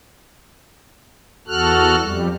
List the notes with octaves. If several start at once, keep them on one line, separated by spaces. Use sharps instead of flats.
E2 F#4 A4 F6 F#6
F2 G3